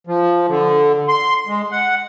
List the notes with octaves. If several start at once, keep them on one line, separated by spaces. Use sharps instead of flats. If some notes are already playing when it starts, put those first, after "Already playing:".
F3
D3
C6
G#3
F#5